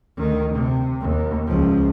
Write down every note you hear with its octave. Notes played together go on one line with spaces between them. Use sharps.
D2 D#3
C3
D#2
C#2 F3